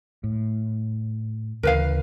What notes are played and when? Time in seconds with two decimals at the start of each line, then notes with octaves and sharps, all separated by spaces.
0.24 A2
1.63 D2 C#3 E3 A#4 B4 F5